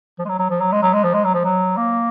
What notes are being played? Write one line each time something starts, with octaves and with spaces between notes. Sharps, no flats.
F3
G#3
F#3
F#3
F3
F#3
G#3
F#3
G#3
F3
G#3
F#3
F3
F#3
A#3